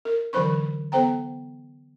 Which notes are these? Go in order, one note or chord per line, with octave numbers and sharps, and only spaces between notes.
A#4
D3 E3 F#3 C5 B5 C#6
B3 A4 C5 G5 A#5